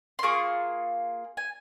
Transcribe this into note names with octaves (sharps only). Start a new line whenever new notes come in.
C6
A#3 F4 G#4 C#6
G#5